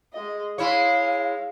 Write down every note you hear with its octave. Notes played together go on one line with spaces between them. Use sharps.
G#3 D#5
G#3 E4 C#5 F5